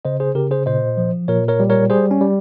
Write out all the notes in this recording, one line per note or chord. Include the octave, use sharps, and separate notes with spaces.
C#3 C5 D#5
G#4 C5
C#3 G4 A#4
G#4 C5
A#2 C5 D#5
F3
A#2 A#4 C#5
A#4 C#5
G3
A#4 C#5
G3 G#4 C5
C#4
G3